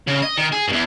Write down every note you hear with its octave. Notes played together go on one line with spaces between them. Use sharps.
C#3
D#5
D#3
G#4
E2 G2